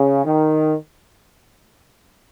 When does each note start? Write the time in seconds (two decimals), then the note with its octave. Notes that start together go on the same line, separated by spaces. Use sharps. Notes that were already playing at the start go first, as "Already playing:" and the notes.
Already playing: C#3
0.25 D#3